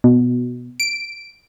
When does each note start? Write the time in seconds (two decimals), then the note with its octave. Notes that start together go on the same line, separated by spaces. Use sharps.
0.04 B2
0.80 D7